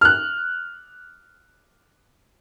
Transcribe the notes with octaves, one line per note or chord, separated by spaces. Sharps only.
F6 F#6